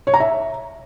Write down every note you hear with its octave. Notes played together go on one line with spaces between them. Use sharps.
C#5
A#5
E5